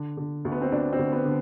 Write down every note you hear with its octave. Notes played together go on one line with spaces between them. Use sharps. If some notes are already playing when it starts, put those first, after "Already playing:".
Already playing: D3
D3
D2
B3
C4
D2 D4
C4
D2
B3
D3